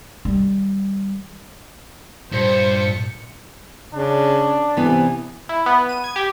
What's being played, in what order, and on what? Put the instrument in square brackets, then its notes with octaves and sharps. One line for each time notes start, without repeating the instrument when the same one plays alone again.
[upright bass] D#3 G3
[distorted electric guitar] G2 [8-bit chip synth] A#2 [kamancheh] C5 [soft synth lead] C#7
[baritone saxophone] C#3 [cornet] D4
[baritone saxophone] C3 [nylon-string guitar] E3 B3
[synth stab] E4
B3
D#7
G#6
G4